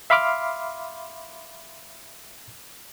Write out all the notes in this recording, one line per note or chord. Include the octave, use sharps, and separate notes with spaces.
E5 F5 B5 C6 D6 F6